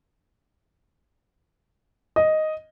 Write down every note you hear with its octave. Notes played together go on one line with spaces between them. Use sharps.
D#5